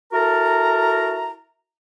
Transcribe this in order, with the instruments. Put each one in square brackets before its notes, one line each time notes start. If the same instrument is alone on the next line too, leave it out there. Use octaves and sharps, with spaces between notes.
[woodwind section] E4 F#4 A4 A#4 A5 A#5